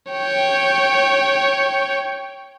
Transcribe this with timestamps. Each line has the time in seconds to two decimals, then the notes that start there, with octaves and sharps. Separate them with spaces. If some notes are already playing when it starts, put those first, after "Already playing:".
0.12 C#5 G5